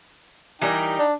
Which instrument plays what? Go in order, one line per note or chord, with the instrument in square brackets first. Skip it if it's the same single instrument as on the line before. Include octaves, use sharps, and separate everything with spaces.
[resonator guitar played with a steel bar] E3 G3 A#4 [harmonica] D#4 G5
[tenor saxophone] D4